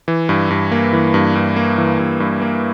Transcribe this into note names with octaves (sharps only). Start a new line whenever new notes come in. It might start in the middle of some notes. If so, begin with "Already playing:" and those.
E3
G2
G2
A#3
E3
G2
G2
A#3
E3
G2
G2
A#3